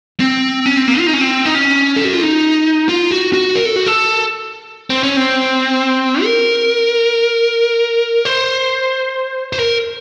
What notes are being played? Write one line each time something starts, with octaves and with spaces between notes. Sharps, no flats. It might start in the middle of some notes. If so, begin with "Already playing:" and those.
C4
C#4
C4
A#3
F4
D#4
C#4
C4
D#4
C#4
A4
F#4
F4
D#4
F4
F#4
F#4
A#4
A4
F#4
A4
C4
C#4
C4
A#4
C5
C5
A#4